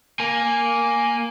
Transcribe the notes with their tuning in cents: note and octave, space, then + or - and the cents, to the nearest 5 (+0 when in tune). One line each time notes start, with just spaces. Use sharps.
A#3 +0 G#5 -5